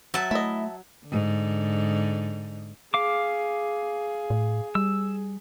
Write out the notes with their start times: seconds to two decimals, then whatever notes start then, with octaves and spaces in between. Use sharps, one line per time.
0.14 F#3 E5 A5
0.31 A3 E4 D#5
1.07 G#2 D3
2.94 G#4 F5 D6
4.30 A2
4.75 G3 E6